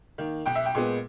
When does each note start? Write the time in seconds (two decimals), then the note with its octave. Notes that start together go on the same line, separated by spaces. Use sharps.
0.18 D#3 A#3
0.46 B1 G5
0.55 E5
0.65 G5
0.75 A#2 G#3 B3